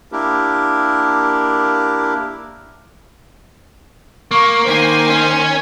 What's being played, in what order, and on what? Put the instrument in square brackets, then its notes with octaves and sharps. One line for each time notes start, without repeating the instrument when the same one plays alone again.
[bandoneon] A#3 D4 E4 G4 A#4
[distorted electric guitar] A#3 [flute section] C#6
[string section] D#3 G#5 [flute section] C5
[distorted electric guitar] C#4